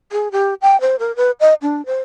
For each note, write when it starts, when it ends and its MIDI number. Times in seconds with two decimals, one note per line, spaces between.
0.12 0.28 68
0.32 0.54 67
0.62 0.79 79
0.81 0.96 72
0.99 1.15 70
1.16 1.31 71
1.40 1.54 75
1.62 1.85 62
1.86 2.02 72